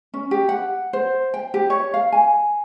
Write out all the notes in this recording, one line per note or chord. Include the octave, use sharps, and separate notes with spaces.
C#4
G4
F#5
C5
G5
G4
C#5
F5
G#5